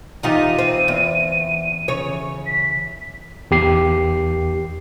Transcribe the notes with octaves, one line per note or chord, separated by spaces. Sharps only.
E3 D#4 F4 G4 C5 F5 D#7
C4
E2 E4
C#3 E3 C#5
B6
E2 G4 C7